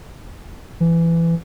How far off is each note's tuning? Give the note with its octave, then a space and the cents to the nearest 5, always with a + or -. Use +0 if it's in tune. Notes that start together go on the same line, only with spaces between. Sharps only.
E3 +20